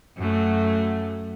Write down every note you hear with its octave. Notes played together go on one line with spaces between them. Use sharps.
F#2 F#3 A3